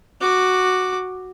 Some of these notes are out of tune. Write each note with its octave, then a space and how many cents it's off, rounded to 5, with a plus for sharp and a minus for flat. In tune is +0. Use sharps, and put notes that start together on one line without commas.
F#4 +0 D6 +10